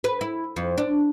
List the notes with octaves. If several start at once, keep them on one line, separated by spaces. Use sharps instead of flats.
B4
E4
F2
D4